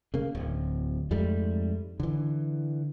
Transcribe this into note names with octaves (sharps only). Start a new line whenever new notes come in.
C#3 A#3
D1
F2 G#2 G3 A3
D3 E3